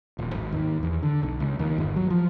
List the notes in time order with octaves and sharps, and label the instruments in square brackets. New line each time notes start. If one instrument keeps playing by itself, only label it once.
[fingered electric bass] D#1
G#1
D#2
E2
D3
B1
C#2
D#2
G1
F#3
F3